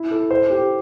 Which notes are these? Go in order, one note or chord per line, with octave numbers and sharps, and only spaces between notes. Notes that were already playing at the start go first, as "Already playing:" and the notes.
Already playing: E4
A4
C5
G4